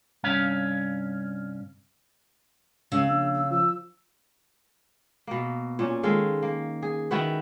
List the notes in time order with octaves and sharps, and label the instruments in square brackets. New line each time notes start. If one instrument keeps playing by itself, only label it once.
[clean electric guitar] C2 G2 C#4 F5
[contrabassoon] C#2 [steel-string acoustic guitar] C#3 [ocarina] E6
[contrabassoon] A#1 [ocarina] E6
[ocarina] E6
[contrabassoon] F3 [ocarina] E6
[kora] B2 A#3
A#2 C#4
D#3 G#3 A4 F5
A#3
G#4
D#3 E4 F#4 B4